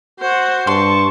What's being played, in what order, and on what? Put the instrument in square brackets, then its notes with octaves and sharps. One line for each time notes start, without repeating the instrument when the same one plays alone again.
[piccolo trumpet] F#4 [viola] C5
[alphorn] G2 [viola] A5 [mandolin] C6 [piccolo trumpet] C#6